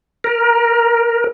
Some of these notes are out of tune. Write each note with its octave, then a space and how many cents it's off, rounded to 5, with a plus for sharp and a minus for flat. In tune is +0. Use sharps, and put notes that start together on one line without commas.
A#4 +15